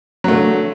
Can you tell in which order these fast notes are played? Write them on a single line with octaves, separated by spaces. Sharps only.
F#3 A3 D3